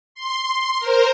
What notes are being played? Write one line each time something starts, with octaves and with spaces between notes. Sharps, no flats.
C6
A#4 C5